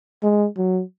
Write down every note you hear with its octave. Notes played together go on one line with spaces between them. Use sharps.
G#3
F#3